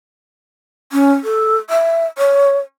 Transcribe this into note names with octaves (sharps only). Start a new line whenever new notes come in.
C#4
A4
E5
C#5